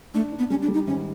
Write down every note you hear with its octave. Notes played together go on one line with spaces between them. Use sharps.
A3 D4
D4
B3
G3 C#4
D4
G3
D#4
G#1 C#4